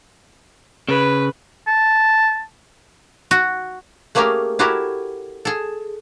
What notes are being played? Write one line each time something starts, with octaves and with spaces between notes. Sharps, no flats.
C#3 B4
A5
F#4
A3 A#3 C#4 G4 G#4 A#4
E4 F#4 G4 A4 A#4 C#5
G#4 A4